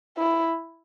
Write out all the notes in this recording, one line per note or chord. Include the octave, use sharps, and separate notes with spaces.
E4